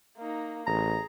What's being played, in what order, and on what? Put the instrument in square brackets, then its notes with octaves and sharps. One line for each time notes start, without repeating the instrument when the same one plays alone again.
[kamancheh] A#3 D#4
[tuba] A1 [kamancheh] G#4 [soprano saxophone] A#5